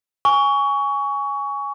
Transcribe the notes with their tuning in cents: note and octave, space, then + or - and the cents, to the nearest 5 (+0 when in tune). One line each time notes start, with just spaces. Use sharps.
G#5 -10 C#6 +20